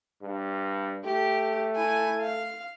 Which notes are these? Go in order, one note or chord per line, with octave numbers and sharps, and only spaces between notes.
G2
A3 G4
E4 G#5
F5